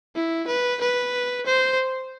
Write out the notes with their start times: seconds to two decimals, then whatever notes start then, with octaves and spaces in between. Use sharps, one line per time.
0.15 E4
0.47 B4
0.81 B4
1.46 C5